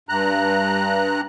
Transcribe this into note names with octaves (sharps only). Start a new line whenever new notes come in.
G2 A#5 F#6